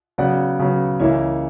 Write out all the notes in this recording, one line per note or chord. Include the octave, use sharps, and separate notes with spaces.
C#3 F#3 B3 D5 F#5
C#3 F#3 B3
C#2 C#3 E3 A#3 E4 C#5 E5